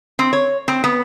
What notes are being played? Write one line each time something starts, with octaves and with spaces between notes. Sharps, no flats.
C4
C#5
C4
B3